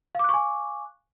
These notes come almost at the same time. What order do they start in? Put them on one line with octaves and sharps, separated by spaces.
F5 D6 F#6 C#6 G#5